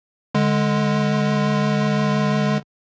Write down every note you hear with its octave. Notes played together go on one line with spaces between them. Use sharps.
D3 G#3